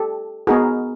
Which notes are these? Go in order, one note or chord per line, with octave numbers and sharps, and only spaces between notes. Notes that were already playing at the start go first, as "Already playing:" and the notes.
Already playing: G4 A4
B3 D#4 F#4 G#4 A#4